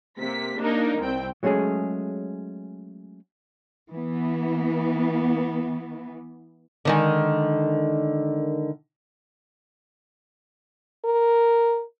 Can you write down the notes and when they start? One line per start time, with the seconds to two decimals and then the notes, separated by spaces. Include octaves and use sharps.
0.18 C3 A#3 B6
0.58 A#3 D4 D#4 A#4
0.99 C2 C4 G5
1.43 F#3 G#3 A3 C#4 G#4
3.91 E3 B3
6.85 D3 D#3 G#3
11.05 A#4